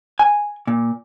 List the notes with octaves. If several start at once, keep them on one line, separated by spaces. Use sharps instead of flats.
G#5
A#2